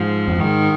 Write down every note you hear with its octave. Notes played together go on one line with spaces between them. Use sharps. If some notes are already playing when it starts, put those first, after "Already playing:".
Already playing: G#2 F3
F2
G#2 D#3